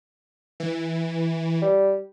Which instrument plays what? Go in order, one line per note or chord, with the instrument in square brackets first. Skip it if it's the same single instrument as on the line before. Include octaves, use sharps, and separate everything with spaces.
[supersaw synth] E3
[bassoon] G3